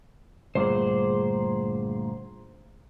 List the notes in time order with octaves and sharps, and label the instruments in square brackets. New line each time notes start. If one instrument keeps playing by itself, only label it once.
[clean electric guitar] D2 G2 A#2 [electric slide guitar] G#4 C5